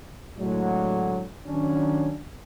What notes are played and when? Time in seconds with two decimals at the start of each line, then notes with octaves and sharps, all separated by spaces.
0.38 A2 D3 F#3 G#3
1.46 D#3 F#3 C#4 D4